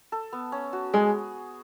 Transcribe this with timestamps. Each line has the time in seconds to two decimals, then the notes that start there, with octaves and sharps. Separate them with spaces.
0.12 A4
0.33 B3
0.52 C#4
0.73 F#4
0.94 G#3 G#4